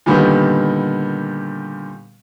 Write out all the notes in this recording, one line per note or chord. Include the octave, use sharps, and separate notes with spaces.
A#2 D3 D#3 G3 B3